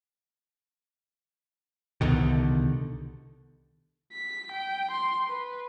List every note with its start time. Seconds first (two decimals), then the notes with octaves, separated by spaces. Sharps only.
2.01 C2 B2 D3 D#3
4.13 B6
4.52 G5
4.91 C6
5.28 B4